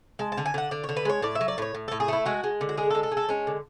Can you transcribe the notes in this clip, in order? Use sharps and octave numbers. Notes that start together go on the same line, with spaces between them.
G#3 A5
A5
D3
G#5
D3 F#5
D3 D5
C#5
D3
B4
G#3 C#5
A2 D5
E5
F#3
D5
A2 C#5
A2
A2 A4
G#4
A3 E4
G#3 F#4
G#3
D3
F#4
G#3 G#4
A4
G#3
A4
G#3
A4
G#3 C#4
D3